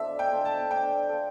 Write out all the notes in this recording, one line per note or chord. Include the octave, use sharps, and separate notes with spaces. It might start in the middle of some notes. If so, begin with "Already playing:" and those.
Already playing: D4 A4 C5 E5 F5
G5
A4 C5 F5
A5
D4 G5
A4 C5 F5